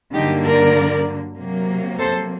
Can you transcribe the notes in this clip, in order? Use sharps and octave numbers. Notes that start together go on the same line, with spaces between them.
G2 D3 F#3 A#3 D#4 G4
A#4 D5
C3 F#3 A#3
A4 C5